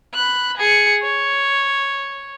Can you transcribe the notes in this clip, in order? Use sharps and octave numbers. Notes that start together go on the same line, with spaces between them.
B5 F#6
G#4 C#7
C#5